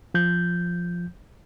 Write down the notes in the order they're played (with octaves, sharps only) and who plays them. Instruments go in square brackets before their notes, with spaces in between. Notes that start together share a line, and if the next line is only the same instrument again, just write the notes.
[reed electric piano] F3 G6